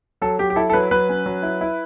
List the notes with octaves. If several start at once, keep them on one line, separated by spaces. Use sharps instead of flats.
F#3 A4
F#3 G4
G4
E4 A4
A4
F#3 B4
F#3 B4
C#4
F#3
E4
E4